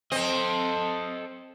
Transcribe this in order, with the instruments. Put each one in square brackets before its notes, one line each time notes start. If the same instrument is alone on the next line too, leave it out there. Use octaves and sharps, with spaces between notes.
[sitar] C4 [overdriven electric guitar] A4 D#5